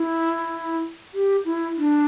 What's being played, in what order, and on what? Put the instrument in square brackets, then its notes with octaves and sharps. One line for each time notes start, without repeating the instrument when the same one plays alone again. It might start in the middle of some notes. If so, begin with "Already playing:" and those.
Already playing: [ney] E4
G4
E4
D4